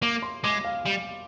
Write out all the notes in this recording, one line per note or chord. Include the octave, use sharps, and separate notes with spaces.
A#3 D6
C6
G#3 D6
F5
G3